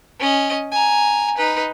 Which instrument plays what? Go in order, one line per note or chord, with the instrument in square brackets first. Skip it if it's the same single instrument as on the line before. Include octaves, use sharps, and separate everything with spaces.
[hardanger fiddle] C#4 D#5
G#5 A#5
D#4 B4